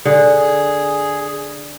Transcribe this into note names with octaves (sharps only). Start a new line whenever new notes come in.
D3 G#4